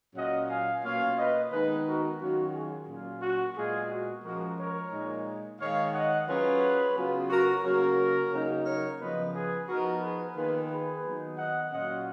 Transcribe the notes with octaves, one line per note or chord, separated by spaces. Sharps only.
A#2 F#3 C#4 F4 D#5 F#5
F5 G#5
B2 A#3 C#4 F4 C#5 F5
B4 D#5
D#3 G#3 B3 D#4 G#4 B4
F#4 A#4
D#3 F#3 C#4 F4 F#4
F4 G#4
A#2 F#3 C#4 F4
F#4
A#2 G#3 B3 F4 G#4
F#4
F3 G#3 C#4 F#4 A#4
A#4 C#5
A#2 G#3 D#4
D#3 G#3 D#4 C#5 F5
D#5 F#5
F#3 C#4 F4 G#4 B4
C#3 F#3 B3 F4
F#4 A#4
C#3 F#3 A#3 F#4 A#4
C#3 F#3 A#3 D#4
A#4 C#5
C#3 F3 B3 B4 D#5
G#4 B4
F3 B3 D#4 F#4 A#4
G#4 B4
D#3 A#3 F4 G#4 B4
G#4 B4
D#3 F#3 B3 D#4
D#5 F#5
A#2 F#3 C#4 F4 D#5 F#5